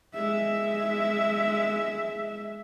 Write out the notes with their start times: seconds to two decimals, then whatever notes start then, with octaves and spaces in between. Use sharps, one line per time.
0.15 G#3 E5